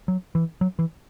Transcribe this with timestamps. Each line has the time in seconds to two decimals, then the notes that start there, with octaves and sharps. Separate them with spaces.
0.08 F#3
0.35 E3
0.61 F#3
0.79 E3